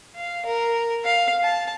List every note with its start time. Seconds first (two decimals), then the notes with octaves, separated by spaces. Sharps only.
0.16 F5
0.46 A#4
1.05 F5
1.44 A5